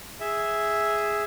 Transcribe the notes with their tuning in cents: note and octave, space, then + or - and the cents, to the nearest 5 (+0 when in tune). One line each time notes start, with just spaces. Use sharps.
G#4 +0 E5 +0